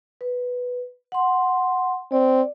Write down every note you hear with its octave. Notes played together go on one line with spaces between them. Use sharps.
B4
F#5 C6
C4 D5